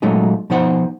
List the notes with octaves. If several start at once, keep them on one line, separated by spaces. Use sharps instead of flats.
A#2 F#3 G#3 A3 D#4
B2 F3 D#4 C5 F#5